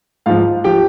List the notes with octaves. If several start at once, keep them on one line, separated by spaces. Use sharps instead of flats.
G#2 F3 F4 F5
F3 G4 G5